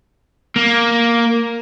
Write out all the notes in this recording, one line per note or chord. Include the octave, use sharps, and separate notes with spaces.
A#3